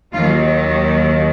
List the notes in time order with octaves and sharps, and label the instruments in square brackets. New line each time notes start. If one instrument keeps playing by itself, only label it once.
[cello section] D#2 D#3 F#3 F4